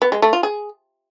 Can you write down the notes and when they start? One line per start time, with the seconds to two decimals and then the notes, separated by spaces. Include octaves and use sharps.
0.02 B3
0.12 G#3
0.22 A3
0.33 F4
0.43 G#4